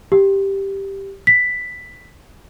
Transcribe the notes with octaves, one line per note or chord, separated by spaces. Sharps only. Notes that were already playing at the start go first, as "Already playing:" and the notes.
G4
B6